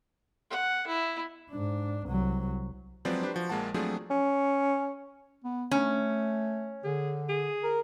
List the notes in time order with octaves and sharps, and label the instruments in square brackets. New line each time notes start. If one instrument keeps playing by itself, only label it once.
[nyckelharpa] F#5
E4
[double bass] G#2 D4
C2 F#3
[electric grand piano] F3 F#3 G#3 C4 B4 D5
D4 G4 B4 C5
F3 F#4
A#1 G#3 A#3 F#5 A5
F3 F#3 A3 C4 D4 G#4
[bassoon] C#4
[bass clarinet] B3
[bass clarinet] A3 [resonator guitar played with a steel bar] C#4
[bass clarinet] D3 [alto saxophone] G#4
[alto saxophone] G#4
[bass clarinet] A#4